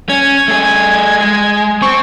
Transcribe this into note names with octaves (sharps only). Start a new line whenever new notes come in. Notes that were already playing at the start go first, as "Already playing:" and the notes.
C#4 G#6
A3 G#4
G#3
C4 C#6